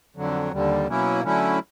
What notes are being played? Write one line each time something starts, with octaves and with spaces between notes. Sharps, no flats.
F2 D3 F#3
D#2 D3 G3
B2 F#3 A#3 C#4 E4
D3 F#3 A3 C#4 E4